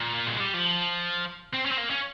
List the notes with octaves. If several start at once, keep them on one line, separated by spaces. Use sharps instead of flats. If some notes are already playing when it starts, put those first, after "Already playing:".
Already playing: A#2
A#3
G#3
G3
F3
C4
C#4
C4
A#3
C#4